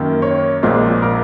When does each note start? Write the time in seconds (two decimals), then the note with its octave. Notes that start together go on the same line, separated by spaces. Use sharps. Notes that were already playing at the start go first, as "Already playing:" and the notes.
Already playing: F#2 D#3 A#3
0.22 C#5
0.63 A#1 A#2 G#3 C4
1.02 A#4